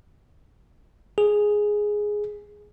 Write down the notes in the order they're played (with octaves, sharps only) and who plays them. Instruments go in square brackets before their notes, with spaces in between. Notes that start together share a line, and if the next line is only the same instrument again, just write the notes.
[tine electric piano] G#4